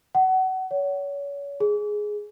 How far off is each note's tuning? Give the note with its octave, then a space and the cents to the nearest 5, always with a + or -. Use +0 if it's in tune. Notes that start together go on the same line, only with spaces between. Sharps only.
F#5 +25
C#5 +30
G#4 +5